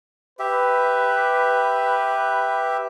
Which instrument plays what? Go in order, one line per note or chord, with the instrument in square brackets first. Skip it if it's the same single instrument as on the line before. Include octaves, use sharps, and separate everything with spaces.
[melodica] G4 E5 [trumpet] B4